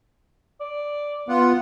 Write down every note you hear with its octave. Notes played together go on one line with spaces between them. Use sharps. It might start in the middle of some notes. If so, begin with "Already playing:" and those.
D5
B3 F4 F#5